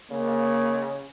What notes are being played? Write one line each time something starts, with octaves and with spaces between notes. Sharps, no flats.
C#3 A#3